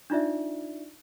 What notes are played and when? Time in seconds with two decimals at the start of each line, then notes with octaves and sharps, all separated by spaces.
0.10 D4 D#4 F4 D5 E5